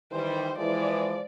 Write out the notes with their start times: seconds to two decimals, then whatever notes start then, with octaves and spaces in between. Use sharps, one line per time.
0.12 D#3 E3 G3 C5
0.58 E3 F3 G#3 D5